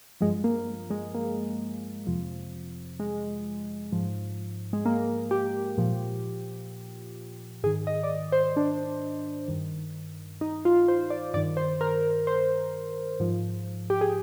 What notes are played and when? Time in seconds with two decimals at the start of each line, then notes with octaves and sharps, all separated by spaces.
0.21 G2 F3 G#3
0.44 A#3
0.67 A#3
0.90 G#3
1.14 A#3
2.07 F2 C3 F3
3.00 G#3
3.92 G#2 F3
4.73 G#3
4.86 A#3
5.31 G4
5.78 A#2 F3
7.63 G#2 D#3 G#4
7.87 D#5
8.03 D5
8.10 D#5
8.32 C5
8.57 D4
9.48 G2 D#3
10.41 D#4
10.65 F4
10.88 C5
11.10 D5
11.34 G2 D#3 D5
11.57 C5
11.81 A#4
12.27 C5
13.20 G#2 F3
13.90 G4
14.01 G#4